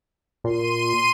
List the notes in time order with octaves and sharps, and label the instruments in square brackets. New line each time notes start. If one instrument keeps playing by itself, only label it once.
[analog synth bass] A#2 [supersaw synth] C6 D#7